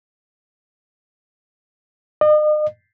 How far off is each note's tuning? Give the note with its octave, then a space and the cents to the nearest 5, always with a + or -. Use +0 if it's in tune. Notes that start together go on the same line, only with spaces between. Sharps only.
D#5 -40